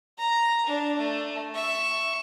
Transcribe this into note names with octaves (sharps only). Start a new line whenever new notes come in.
A#5
D4
A3
E5 C#6